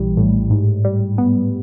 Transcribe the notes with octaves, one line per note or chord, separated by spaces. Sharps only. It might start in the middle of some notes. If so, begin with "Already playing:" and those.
Already playing: A#1 E3 G3
A2
G#2
G3
B3